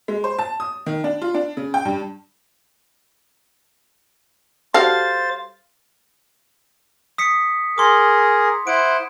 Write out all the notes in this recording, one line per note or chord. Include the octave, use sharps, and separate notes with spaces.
G#3
C5
A5
D#6
D#3
D4
F4
D4
C#3
G5
G2
G3 F#4 A4 C5 F5 A6
D#6 B6 C#7
G#4 A#4 C6 D6
E4 C5 F#5 D7